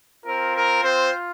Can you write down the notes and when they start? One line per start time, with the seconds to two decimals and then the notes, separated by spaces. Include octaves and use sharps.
0.25 C4 F4 A#4
0.54 A#4
0.82 C4 C5